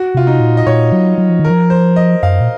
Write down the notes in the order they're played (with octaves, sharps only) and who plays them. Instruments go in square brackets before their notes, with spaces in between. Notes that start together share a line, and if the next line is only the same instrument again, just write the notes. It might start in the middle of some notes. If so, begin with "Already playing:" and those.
Already playing: [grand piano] F#4
[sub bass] C3 [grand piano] F4
[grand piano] D#4
[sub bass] A#2
[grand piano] D#5
[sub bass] A#2 [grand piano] C#5
[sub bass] F#3
F#3
F3
D#3
[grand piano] A#4
[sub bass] F3
[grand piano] C5
D#5
[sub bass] F#2 [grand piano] F5
[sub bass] A#2